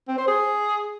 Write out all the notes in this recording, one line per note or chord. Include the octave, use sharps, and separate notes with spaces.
C4
C5
G#4